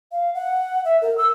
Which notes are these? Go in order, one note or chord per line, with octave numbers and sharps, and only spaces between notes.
F5
F#5
E5
A#4
E6